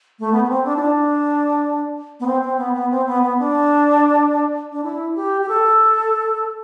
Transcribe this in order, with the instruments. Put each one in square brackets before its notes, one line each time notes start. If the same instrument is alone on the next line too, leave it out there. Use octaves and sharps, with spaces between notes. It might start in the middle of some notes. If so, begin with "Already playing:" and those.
[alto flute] A3
B3
B3
C4
D4
E4
D4
B3
C4
C4
B3
B3
C4
B3
B3
D4
D4
E4
G4
G4
A4